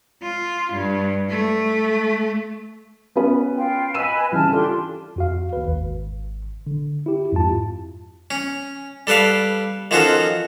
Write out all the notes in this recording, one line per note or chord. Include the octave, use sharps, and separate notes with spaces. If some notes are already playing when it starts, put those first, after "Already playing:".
F4
G2
A3
B3 C#4 B4
F4 G5
B4 D#5 G#5 E6 D#7 E7
C#3 E3 G3 A5 F6
D4 F4 G4 A4 C6
F2 F#4 F5
D#2 B4
G#1
D3
E4 G4
F2 G#2 E4 F4 A5
C#4
G3 A4 B4 D5 F5
D#3 F3 C#4 F4 F#4 A4